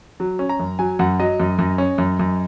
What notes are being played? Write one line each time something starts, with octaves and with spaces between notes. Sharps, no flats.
F#3
C#4
A#5
F#2
F#3 G#5
F#2 F#5
F#3 D#5
F#2
F#2
C#4
F#2
F#2